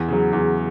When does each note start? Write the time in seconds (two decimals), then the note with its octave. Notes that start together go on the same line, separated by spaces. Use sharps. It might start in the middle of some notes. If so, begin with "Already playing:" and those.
Already playing: E2
0.08 C#3 F#3
0.33 E2